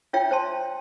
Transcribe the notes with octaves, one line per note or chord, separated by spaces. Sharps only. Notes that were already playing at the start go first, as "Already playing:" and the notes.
D4 F4 C#5 E5 G5
D4 C5 C#5 A5 C6